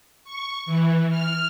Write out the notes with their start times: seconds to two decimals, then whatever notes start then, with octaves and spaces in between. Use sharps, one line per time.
0.24 C#6
0.66 E3
1.10 F6